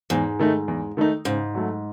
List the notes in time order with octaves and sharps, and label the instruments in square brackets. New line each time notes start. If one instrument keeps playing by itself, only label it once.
[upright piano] E2 [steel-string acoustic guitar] G#2
[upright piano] D#3 A3 D#4
E2
D#3 A3 D#4
[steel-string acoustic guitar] G#2 [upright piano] C#3
[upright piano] F#3 A3